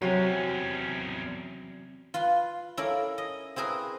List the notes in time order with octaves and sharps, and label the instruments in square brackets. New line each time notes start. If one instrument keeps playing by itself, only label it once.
[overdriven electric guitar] E2 C#4 [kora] C3 F#3
[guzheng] F4 B4 C6
C#4 E4 A4 A#4 D5 F5
D#5
C4 E4 G#4 A#4 B4